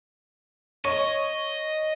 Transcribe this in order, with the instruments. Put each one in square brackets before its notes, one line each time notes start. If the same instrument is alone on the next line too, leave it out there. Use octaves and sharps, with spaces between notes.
[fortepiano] C#5 [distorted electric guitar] D#5